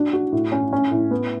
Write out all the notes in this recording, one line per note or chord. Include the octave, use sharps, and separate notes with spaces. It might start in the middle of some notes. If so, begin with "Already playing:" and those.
Already playing: D4 F#4
F#4
A2
C#4
C#4
A2
B3